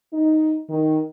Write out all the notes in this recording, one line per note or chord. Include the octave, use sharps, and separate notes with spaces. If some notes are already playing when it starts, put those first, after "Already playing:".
D#4
D#3